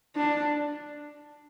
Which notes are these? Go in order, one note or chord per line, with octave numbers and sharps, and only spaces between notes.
D4